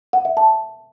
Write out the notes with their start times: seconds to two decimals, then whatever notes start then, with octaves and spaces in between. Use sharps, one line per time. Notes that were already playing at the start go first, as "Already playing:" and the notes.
0.13 F#5
0.25 E5
0.37 A5